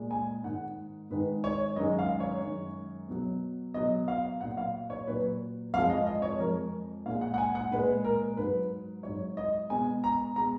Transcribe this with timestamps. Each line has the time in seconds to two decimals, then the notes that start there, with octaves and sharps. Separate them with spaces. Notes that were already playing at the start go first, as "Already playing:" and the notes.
Already playing: A#2 G#3
0.11 G#5
0.43 G#2 D#3 G#3 F#5
1.10 G#2 D#3 G#3 B4
1.44 C#5
1.76 F#2 D#3 G#3 D#5
1.99 F5
2.20 C#5
2.42 F#2 D#3 G#3
3.08 B2 F#3
3.74 B2 F#3 D#5
4.08 F5
4.41 A#2 F#3 F#5
4.57 F5
4.90 C#5
5.07 A#2 F#3 B4
5.74 F2 F3 G#3 F5
5.90 D#5
6.07 D#5
6.22 C#5
6.39 F2 F3 G#3 A#4
7.06 A#2 G#3 F5
7.21 F#5
7.34 F#5
7.38 G#5
7.55 F#5
7.71 A#2 G#3 B4
8.04 A#4
8.37 G#2 F#3 B4
9.03 G#2 F#3 C#5
9.37 D#5
9.70 B2 G#3 G#5
10.04 A#5
10.36 B2 G#3 A#5